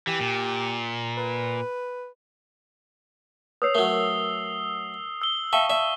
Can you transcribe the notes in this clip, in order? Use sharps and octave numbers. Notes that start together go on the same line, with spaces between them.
E3 G4
A#2
B4
B4 C#5 D#6 E6 C7
F#3 A3 A#4 G7
E6 G7
E5 F5 G5 A5 C#6 G7
D5 E5